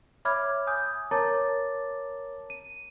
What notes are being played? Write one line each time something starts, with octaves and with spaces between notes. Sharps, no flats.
C#5 E5 B5 D6 F6 G#6
G#5 D#6 G6
A#4 C#5 A5 A#5 D6 A6
D#7